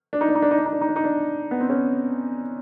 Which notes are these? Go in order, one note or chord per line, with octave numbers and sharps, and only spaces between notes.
D4
D#4
D4
D#4
D4
D#4
D4
D#4
D4
D#4
D4
D#4
D4
B3
C4
C#4